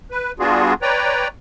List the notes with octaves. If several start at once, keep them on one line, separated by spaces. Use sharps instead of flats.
B4
G3 B3 D4 F4 F#4 G#4
B4 C#5 D5 G5 A#5